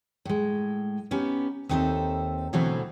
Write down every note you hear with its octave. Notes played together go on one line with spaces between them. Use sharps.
A2 G#3
B3 C#4 D#4 G4
D#2 C4 D#4 A4 C5 E5
B2 D3 E3 F#3 A3 C4